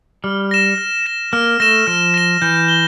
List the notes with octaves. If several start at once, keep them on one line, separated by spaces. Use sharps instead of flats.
G3 F6
A#6 E7
F6
A#6 E7
A#3 F6
A3 A#6 E7
F3 F6
A#6 E7
E3 G6
G7